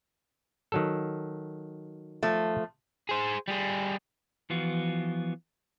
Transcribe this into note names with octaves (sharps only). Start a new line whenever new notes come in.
D#3 F#3 A4
F3 A3
G#4 C5
G3 G#4
E3 F3 B3 F4 F#4